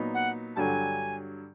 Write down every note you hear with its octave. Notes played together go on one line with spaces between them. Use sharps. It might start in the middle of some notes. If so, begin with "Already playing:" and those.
Already playing: A#2 F#3 B3 D#4
F#5
G2 D3 F#3 G#5 A5